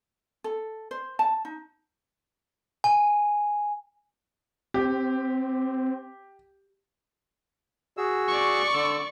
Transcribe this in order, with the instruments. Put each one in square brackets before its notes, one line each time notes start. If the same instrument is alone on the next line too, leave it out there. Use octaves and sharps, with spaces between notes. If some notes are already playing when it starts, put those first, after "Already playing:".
[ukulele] A4
C5
A5
D#4
[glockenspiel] G#5
[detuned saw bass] C4 [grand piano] G4
[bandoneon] F#4 G#4 E6
[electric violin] D5 C#6
[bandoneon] D3 E6